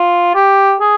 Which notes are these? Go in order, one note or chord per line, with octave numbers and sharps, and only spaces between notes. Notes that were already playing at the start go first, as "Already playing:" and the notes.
Already playing: F4
G4
G#4